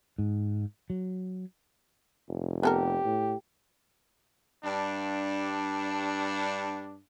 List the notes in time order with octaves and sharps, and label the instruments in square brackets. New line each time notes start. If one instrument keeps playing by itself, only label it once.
[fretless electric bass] G#2
F#3
[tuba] F1
[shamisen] B3 A4 A#4 [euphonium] G4
[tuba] A2
[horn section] G2 D4